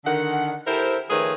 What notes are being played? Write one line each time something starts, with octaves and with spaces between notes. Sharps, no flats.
D3 D#3 F#5
E4 G4 A4 A#4 C5
D#3 F3 A3 G#4 B4 C#5